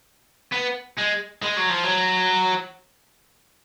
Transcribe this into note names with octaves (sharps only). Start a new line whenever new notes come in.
B3
G#3
G#3
F#3
F3
F#3